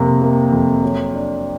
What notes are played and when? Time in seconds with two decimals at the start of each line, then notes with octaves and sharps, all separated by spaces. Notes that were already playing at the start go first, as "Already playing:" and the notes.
Already playing: F2 C3 A#3
0.22 A#3
0.52 F2
0.83 F#3
1.14 D4